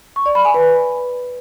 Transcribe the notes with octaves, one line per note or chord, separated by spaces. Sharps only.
C#6
D5
B5
G#5
B4